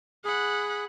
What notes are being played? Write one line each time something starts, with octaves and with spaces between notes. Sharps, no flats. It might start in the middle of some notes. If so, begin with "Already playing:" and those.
G#4 F#5 B5